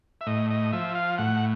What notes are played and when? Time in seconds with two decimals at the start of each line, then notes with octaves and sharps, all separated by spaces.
0.21 E5
0.26 A2 D#5
0.50 D#5
0.73 F3 E5
0.95 F5
1.18 A2 F#5